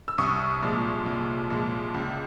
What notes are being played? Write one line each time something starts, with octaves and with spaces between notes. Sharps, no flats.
E6
C2 C#6 D#6
A#2 F3 G#3
C2
A#2 F3 G#3
C#2